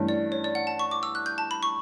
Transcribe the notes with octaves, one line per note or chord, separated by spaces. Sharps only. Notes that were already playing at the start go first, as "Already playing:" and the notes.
Already playing: G2 E3 A3 C#4
D5
C#5
D5
F#5
A5
C#6
D6
E6
F#6
G6
A5
B5
C#6